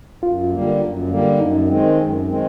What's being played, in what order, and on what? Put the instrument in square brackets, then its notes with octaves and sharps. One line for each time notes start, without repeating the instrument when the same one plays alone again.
[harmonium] F#2 [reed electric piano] F4
[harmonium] D3 G3 A#3
F#2
D3 G3 A#3
[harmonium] F#2 [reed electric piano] D#4
[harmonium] D#3 G#3 C4
F#2
D#3 G#3 C4